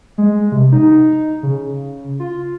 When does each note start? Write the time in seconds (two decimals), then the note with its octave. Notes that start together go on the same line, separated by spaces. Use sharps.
0.18 G#3
0.52 C3
0.72 D#4
1.43 C#3
2.20 F4